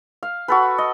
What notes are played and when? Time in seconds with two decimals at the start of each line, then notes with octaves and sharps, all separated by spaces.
0.23 F5
0.48 F#4 A4 B4
0.78 D#5